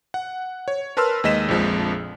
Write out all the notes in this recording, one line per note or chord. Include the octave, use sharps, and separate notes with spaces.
F#5
C#5
A#4 B4 A5 C6 E6 F6
D#2 G#3 D#5 B6 E7
A#1 F2 F3 G#3